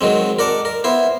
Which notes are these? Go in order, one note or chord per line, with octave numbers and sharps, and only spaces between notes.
D#3 F#3 G#3 C4
A#4 D5 F#5 A5
A#4
B3 E4 C5